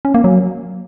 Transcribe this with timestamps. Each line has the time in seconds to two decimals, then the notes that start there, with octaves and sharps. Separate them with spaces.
0.05 C#4
0.14 A#3
0.24 F#3